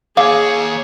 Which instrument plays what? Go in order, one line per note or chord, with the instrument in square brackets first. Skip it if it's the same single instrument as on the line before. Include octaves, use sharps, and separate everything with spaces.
[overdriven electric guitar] D#2 C#5 [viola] G#4 [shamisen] F5 [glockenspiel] D6